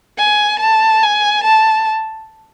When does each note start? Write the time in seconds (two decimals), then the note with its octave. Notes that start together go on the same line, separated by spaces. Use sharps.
0.18 G#5
0.60 A5
1.03 G#5
1.44 A5